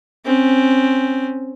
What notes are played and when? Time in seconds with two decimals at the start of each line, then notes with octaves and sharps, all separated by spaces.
0.25 C4 C#4